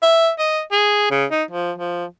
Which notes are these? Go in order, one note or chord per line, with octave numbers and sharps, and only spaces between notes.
E5
D#5
G#4
C#3
D#4
F3
F3